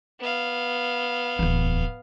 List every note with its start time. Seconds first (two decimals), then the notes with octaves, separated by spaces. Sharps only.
0.20 B3 F5
1.39 D1 E2